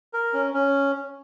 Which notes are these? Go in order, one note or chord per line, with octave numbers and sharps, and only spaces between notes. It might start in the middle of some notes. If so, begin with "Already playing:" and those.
A#4
C#4
C#4